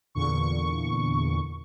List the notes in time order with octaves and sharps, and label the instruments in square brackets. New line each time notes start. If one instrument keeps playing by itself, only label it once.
[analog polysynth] E2 A#2 D3 C#6